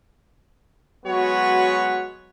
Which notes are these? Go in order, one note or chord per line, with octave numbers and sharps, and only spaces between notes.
F#3 G#3 B3 F#4 B4 C#5